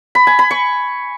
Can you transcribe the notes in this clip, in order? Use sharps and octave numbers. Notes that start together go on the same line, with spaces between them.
B5
G#5
B5
C#6